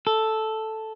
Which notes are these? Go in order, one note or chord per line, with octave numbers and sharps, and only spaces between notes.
A4